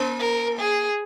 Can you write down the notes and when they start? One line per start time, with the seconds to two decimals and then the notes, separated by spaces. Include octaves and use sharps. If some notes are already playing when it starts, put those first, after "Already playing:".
Already playing: A#3
0.20 A#4
0.59 G#4